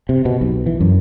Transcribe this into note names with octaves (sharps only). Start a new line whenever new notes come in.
C3
B2
B1
E3
F#2